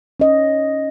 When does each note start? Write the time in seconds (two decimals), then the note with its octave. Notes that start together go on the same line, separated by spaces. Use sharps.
0.20 C#4 D#5